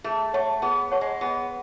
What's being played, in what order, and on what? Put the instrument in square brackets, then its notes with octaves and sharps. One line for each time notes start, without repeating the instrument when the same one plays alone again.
[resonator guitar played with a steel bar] A3 [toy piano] G#4
[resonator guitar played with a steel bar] A3 [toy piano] C#5 F#5 A5 C#6
[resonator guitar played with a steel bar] B3 [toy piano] G#4
[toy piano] C#5 F#5 A5 C#6
[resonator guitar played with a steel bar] G#3
[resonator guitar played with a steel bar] B3 [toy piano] G#4